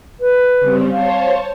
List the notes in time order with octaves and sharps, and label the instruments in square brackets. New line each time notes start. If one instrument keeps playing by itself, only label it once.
[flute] B4
[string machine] C#3 G3 C4
[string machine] C5 C#5 A5 [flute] F5